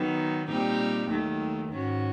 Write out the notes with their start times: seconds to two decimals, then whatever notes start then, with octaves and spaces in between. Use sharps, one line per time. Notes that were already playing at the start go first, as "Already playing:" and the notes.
Already playing: D#3 F#3 B3 D#4
0.47 A#2 G3 C4 D#4 G4
1.09 D#2 D#3 F#3 A3
1.71 G#2 D#3 G#3 C#4 F#4